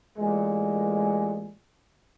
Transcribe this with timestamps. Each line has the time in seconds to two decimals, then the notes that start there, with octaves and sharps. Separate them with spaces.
0.18 A1 A#2 G#3